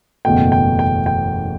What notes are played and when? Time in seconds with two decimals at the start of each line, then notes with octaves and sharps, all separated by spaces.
0.25 F#1 E2 B2 A3 G5
0.52 G5
0.79 G5
1.06 G5